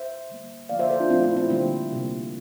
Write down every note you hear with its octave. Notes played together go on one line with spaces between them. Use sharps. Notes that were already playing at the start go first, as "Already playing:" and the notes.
Already playing: C5 E5
D3 G3 A#3
D3 F3 A#3 D5 F5
C5 E5
A4 C5
D4 F4
A#2 F3 A3 C4 E4
C4 E4
C4 E4
D3 G3 A#3 C4
C3 G3 A#3